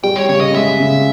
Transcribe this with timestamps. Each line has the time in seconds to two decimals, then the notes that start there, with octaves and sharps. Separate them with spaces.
0.04 G3 G5
0.16 C#5
0.29 C#3 C#5
0.41 D#5
0.54 G#3 E5
0.80 C#3